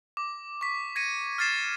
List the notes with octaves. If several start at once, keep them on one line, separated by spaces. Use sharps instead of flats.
D6
C#6 B6
G#6 A#6 B6 C#7 D#7
F6 G#6 A6 C7 E7